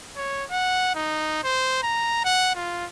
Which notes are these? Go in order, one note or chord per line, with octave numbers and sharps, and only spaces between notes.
C#5
F#5
D#4
C5
A#5
F#5
F4